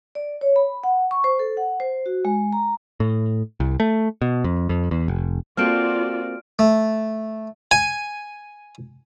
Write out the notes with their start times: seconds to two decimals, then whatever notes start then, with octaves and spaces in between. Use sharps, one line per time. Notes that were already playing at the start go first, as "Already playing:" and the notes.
0.15 D5
0.41 C#5
0.56 B5
0.84 F#5
1.11 C#6
1.24 C5
1.39 A4
1.57 F#5
1.80 C5
2.06 F#4
2.25 G#3
2.53 A#5
3.00 A2
3.60 C2
3.80 A3
4.22 B2
4.44 F2
4.69 F2
4.91 E2
5.08 F1
5.57 A#3 C4 F4 F#4 A4 D5 F6 D7
6.59 A3
7.71 G#5